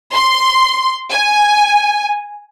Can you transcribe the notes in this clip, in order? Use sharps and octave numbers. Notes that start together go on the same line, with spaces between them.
C6
G#5